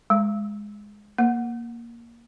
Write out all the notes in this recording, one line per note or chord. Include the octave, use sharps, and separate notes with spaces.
G#3
A#3